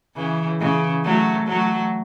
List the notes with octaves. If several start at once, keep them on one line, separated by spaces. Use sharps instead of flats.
C#3 E3
C#3 E3
F#3 A3
F#3 A3